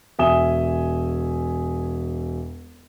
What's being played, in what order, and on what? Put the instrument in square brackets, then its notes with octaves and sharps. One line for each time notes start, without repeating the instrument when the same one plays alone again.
[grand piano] E1 E5 G#5 D#6 E7 G7